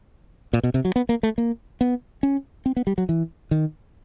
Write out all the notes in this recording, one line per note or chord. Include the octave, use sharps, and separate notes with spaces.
A#2
B2
C3
F#3
B3
A#3
A3
A#3
B3
C#4
C4
B3
G3
F#3
E3
D#3